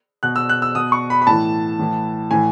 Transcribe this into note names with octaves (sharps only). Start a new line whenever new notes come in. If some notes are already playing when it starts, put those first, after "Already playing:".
B2 F#6
E6
F#6
E6
B2 D#6
C#6
B5
B5
A2 E3 A5
A2 E3
A2 E3 G#5